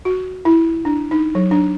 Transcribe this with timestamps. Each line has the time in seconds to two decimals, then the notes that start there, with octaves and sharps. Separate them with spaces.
0.05 F#4
0.45 E4
0.85 D4
1.11 D#4
1.35 F#3
1.51 D4